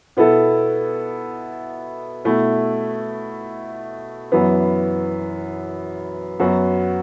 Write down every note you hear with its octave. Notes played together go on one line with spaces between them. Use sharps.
B2 B3 E4 A4
B2 A3 E4
F#2 E3 B3
F#2 F#3 B3 F#4